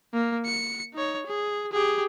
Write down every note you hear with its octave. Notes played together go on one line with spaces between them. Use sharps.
A#3
C#7
D#4 C#5
G#4
G4 G#4